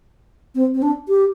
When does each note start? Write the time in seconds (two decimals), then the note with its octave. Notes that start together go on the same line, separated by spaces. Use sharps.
0.55 C4
0.74 C4
0.82 D4
1.09 G4